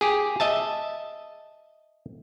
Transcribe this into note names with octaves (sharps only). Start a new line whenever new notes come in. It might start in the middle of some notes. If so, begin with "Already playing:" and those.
G4 G#4
D#5 E5 A5